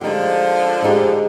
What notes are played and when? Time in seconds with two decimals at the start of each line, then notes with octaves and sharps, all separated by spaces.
0.01 D3 F3 G#3 D#4 G4
0.82 G#3 D#4 G4